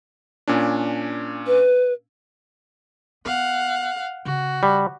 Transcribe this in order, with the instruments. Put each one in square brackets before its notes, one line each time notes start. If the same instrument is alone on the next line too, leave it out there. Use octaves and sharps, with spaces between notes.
[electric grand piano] A#2 C#4 D4
[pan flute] B4
[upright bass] B3 [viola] F5 F#5
[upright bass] C#3 [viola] F#4
[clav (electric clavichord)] G3